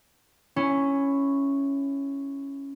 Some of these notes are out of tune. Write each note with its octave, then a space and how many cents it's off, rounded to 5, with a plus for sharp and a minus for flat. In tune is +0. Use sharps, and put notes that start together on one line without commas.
C#4 +0 E4 +10